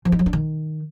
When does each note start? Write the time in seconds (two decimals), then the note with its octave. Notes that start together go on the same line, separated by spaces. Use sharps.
0.05 F3
0.12 D#4
0.19 F#3
0.26 D4
0.33 D#3